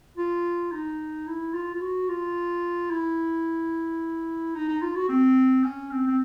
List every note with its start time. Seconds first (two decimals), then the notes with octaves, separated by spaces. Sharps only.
0.17 F4
0.72 D#4
1.26 E4
1.54 F4
1.74 F4
1.81 F#4
2.08 F4
2.90 E4
4.54 D#4
4.68 D#4
4.82 F4
4.95 F#4
5.09 C4
5.63 C#4
5.91 C4
6.06 C4